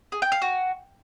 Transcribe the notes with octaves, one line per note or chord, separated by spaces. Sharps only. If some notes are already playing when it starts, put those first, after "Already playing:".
G#4
G5
F5
F#4